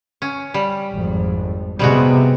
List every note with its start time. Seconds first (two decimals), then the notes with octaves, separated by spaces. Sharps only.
0.22 C#4
0.54 G3
0.93 G#1 F2
1.79 C3 G3 G#3 B3 F#4